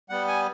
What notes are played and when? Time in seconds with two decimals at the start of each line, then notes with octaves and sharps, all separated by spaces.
0.10 G3 B3 F#5
0.28 G#5